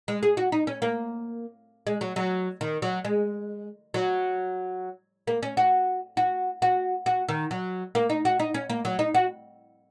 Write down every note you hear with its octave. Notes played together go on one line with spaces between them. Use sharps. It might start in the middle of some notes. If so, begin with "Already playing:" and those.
G#3
G#4
F#4
D#4
C#4
A#3
G#3
F#3
F#3
D#3
F#3
G#3
F#3
A#3
C#4
F#4
F#4
F#4
F#4
D#3
F#3
A#3
D#4
F#4
D#4
C#4
A#3
F#3
D#4
F#4